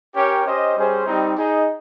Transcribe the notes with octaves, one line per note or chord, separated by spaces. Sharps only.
C#4 G4 A#4 C#5 G5
C#4 G4 C5 D#5
G3 C#4 G#4 C5
G3 C4 D#4
D#4 G#4 D#5